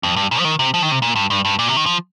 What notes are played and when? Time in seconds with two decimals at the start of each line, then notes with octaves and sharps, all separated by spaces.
0.03 F2
0.16 G2
0.31 A#2
0.39 F3
0.45 D#3
0.59 C3
0.74 F3
0.82 D#3
0.92 C3
1.02 A#2
1.16 G2
1.30 G2
1.45 G2
1.59 A#2
1.68 C3
1.77 D#3
1.86 F3